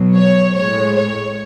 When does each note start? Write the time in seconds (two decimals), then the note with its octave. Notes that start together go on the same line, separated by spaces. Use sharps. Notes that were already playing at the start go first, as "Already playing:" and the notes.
Already playing: B2 F#3
0.16 C#5
0.56 A2 G#3 C#5
0.96 C#5